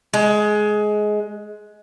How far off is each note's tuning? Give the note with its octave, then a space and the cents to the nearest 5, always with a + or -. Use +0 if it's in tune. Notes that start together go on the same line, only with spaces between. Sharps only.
G#3 +15